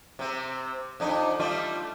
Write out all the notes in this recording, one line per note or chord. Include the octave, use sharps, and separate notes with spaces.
C3 C4
F2 D4 D#4
G3 A3 F4